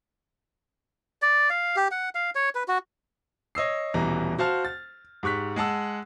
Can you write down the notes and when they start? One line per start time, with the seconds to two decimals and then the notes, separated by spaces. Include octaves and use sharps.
1.22 D5
1.50 F5
1.76 G4
1.91 F#5
2.15 F5
2.35 C#5
2.55 B4
2.68 F#4
3.55 C#5 D#5 E6 C7
3.94 D#1 B2 E3 G3 A#5
4.39 F#4 C5 F5 A5 F6
4.65 A6
5.23 G#2 G4 C#6 F#6 B6
5.56 G#3 F#5 A5 E6